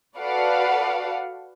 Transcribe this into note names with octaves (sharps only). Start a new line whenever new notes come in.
F#4 A4 B4 D5 F5 F#5